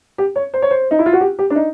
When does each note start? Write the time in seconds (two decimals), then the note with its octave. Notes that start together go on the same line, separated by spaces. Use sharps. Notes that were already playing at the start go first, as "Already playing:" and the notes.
0.18 G4
0.36 C#5
0.54 C5
0.62 C#5
0.71 C5
0.91 D#4
0.99 E4
1.06 F4
1.13 F#4
1.21 G4
1.39 G4
1.50 D4
1.56 D#4